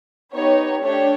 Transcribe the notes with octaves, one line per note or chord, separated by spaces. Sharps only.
B3 D#4 G4 C#5
A3 D4 G4 C#5